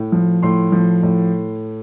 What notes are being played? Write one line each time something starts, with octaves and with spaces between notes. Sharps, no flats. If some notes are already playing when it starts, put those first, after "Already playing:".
Already playing: A2
F3
A2 C6
F3
A2